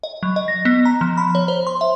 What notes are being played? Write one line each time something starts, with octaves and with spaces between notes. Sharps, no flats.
D#5
F#3
D#5
A#6
B3
A#5
F3
B5
C#5
C5
C6
E5